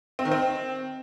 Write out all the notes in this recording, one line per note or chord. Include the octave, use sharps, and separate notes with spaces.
C4
D#3
C4